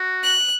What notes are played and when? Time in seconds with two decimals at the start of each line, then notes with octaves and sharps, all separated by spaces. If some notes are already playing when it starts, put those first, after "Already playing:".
Already playing: F#4
0.23 F#6